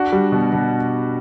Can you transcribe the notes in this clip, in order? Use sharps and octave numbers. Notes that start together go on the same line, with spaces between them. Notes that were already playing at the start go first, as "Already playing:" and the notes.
Already playing: D4 F#4
G3
B2
B2